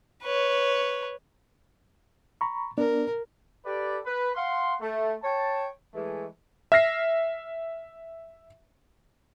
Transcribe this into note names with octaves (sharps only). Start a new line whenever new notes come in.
B4 C#5
A#5 B5 C#6
B3 D4 A#4 D5
G4 A4 B4 D5
B4
F5 F#5 C6
A3
C#5 G5 A5
E3 G#3 A3
E5 F6 A#6 C7